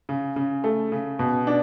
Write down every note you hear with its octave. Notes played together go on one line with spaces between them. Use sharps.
C#3
C#3
A3
C#3
B2
D4